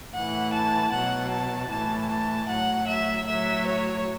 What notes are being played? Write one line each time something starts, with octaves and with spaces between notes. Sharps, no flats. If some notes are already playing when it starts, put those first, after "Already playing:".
A2 E3 F#5
A5
B2 F#3 F#5
A5
A2 E3 A5
A5
A2 F#3 F#5
E5
A2 F#3 E5
C#5